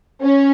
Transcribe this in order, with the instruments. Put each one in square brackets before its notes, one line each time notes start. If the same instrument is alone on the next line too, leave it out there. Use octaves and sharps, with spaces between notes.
[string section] C#4